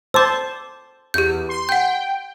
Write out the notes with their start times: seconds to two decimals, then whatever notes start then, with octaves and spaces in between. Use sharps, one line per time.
0.14 C5 A5 D6 E6
1.14 E2 G4 G6
1.49 C6
1.69 F#5 G5 G6